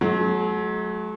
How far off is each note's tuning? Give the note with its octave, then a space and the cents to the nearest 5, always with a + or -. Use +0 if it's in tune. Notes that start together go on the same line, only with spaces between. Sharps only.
F#3 +0 A3 -45